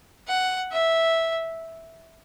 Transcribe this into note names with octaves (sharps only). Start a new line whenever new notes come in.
F#5
E5